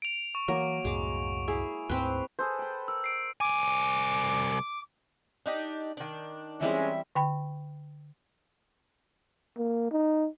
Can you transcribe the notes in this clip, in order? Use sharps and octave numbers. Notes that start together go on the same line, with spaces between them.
D7 F7
C#6
E3 F#3 A#3 A#4
C2 F#2 A2 G#3 D6
E4 G#4
D2 G#2 C4 B4
G#4 A4 B4 C5
G5 B5
A#4 E6
C7 D7
C2 G#5 D6
D4 D#4 G4
D#3 D4
E3 G3 G#3 C4 C#4 E5
D3 G5 B5
A#3
D#4